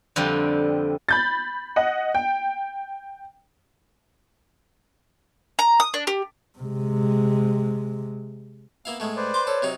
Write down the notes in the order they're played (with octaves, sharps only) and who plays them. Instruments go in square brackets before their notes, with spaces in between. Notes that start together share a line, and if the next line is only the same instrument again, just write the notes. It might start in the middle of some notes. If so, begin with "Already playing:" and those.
[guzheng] F2 D3 F3 G3
[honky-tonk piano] B5 G6 A6
D#5 F#5
G5
[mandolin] A#5
D#6
D4
G4
[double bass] C3 G#3
[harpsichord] A#3 E4 F5 [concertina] B3
[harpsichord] A2 G#3 A3
[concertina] B4 C5 D5
[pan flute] C6 [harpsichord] D6
[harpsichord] A4 [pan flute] C#5
[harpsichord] C3 F#3 D#4